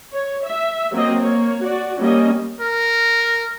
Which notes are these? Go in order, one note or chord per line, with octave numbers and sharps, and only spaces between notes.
C#5
E5
F#3 A#3 C4 D#5
A#3 C#5
F#4 D5
G3 A#3 C#4 D#5
A#4